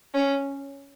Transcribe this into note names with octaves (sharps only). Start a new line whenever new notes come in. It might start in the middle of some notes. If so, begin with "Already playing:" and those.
C#4